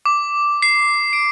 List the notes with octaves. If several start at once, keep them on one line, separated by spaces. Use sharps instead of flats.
D6
C7
D7